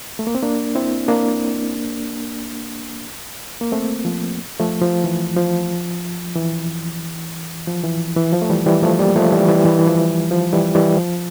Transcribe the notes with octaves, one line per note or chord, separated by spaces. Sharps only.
A3
A#3
C4
A#3 D4
C4 E4
A#3 D4
A#3
A3 C4
F3
F3 A3
F3
E3
F3
E3
F3
E3
E3
F3
A3
E3 G3
E3 G3
F3 A3
G3 A#3
F3 A3
E3 G3
E3 G3
E3 G3
E3
F3
F3
E3 G3
E3 G3
F3